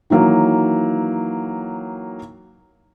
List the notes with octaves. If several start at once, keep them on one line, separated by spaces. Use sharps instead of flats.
D#3 E3 F#3 A#3